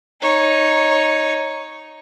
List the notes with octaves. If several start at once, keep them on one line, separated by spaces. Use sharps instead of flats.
D#4 C#5